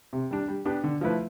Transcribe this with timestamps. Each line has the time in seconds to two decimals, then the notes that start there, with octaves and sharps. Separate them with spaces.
0.13 C3
0.31 G3 D4
0.48 G3
0.65 B3 D4 G4 B4
0.84 D3
1.01 F3 A3 E4 B4